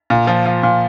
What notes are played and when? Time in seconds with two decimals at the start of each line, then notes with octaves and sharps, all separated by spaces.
0.10 A#2
0.27 F3
0.46 F3
0.63 A#2